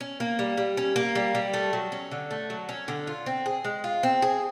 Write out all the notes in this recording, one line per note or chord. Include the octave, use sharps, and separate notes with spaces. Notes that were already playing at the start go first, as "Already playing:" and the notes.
C#4
A#3
G3
G3
C#4
A#3
G3
G3
A3
F#3
C#4
D3
A3
F#3
C#4
D3
F4
C4
G#4
G#3
F4
C4
G#4